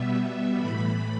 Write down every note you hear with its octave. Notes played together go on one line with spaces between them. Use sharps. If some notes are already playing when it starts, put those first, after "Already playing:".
Already playing: B2 G3 B3 E5
A2 E3 A3 B5